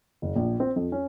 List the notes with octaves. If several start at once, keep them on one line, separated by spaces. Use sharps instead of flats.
F#1
A#1
C4
F2
C#4